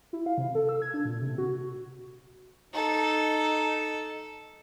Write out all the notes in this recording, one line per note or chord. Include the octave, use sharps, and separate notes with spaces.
E4
F5
C3
A4
E6
G#6
D4
A#2
C3
F#4
D#4 A4